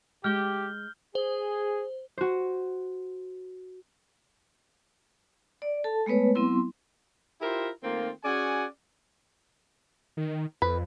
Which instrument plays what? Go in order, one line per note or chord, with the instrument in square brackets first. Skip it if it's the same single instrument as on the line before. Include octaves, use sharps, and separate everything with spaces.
[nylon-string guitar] G#3 [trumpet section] G4 [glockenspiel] F6 G6 G7
[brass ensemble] G#4 [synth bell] C5
[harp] F#4 C5
[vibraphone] D5
A4 A5
G#3 A3 B3 B4 C#5
F#3 B3 C4 E4 C6
[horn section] E4 F4 G4 A#4 C5 E5
D#3 A3 A#3 C4 F4
C#4 F#4 G#4 D5 F#5 G#5
[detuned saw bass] D#3
[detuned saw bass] F2 [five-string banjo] B4